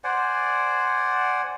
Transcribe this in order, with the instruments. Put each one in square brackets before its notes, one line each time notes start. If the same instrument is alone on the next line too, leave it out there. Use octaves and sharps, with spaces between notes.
[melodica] C5 D5 F#5 G#5